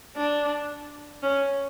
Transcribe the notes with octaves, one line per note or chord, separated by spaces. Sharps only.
D4
C#4